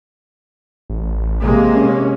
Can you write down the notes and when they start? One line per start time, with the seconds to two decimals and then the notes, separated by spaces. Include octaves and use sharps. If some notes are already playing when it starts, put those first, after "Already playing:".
0.90 A1
1.42 C3 G#3 A#3
1.75 C#4